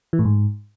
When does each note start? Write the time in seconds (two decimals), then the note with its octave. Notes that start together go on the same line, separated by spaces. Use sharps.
0.13 E3
0.19 A2
0.25 G#2